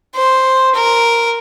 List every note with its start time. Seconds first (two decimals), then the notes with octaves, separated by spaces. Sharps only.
0.16 C5
0.75 A#4